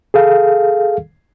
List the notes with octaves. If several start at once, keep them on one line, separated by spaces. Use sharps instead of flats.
G#4 A4 F5